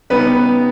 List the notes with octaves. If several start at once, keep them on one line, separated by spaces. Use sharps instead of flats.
C#3 G3 B3 D#4 B4